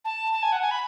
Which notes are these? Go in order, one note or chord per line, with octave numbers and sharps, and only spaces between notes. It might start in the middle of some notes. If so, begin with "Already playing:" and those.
A5
A5
G#5
F#5
G#5
B5